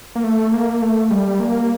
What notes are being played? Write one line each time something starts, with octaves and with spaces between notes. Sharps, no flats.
A#3
A3
A#3
A3
G3
A#3